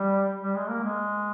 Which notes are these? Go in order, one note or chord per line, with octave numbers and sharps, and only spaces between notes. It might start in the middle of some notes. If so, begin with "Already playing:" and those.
Already playing: G3
G3
G#3
A#3
G#3